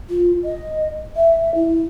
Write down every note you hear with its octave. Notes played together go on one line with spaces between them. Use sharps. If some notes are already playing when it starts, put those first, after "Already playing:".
F4
D#5
E5
E4